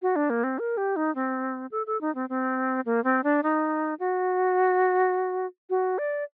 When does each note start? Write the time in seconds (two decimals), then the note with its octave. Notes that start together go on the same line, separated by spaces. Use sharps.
0.02 F#4
0.16 D4
0.30 A#3
0.44 C4
0.59 A#4
0.77 G4
0.96 D#4
1.15 C4
1.71 A4
1.87 A4
2.01 D#4
2.15 C4
2.29 C4
2.86 A#3
3.04 C4
3.24 D4
3.43 D#4
4.00 F#4
5.70 F#4
5.98 D5